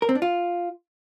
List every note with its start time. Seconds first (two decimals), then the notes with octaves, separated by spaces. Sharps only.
0.02 A#4
0.09 C4
0.15 D4
0.22 F4